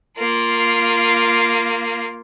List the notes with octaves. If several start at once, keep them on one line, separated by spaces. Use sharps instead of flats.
A#3 F4